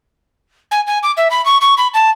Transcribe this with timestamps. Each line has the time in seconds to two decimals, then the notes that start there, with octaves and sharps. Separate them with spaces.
0.71 G#5
0.86 G#5
1.03 D6
1.17 E5
1.30 B5
1.45 C#6
1.61 C#6
1.77 B5
1.93 A5